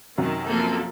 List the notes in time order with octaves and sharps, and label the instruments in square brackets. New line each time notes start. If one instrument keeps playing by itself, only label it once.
[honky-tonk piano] F#2 C3 F#3 [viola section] D#3
[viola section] F3 A#3 A4